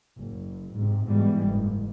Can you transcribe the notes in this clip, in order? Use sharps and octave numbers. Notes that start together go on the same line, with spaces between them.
F#1
G#2 C3
G#2 B2 E3 G3 G#3
F#1 G#2